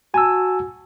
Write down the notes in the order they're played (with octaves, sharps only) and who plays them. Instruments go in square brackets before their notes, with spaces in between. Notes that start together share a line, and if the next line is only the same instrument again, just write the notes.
[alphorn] F#4 [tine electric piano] G#5 A5 E6